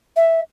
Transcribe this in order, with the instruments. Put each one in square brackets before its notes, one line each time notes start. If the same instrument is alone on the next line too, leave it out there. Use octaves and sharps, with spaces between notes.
[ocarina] E5